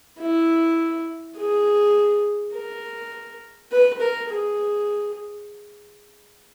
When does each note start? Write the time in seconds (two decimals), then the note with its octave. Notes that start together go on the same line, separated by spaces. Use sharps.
0.19 E4
1.37 G#4
2.54 A#4
3.71 B4
4.00 A#4
4.29 G#4